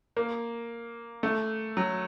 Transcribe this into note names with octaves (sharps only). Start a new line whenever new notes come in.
A#3
A3
F#3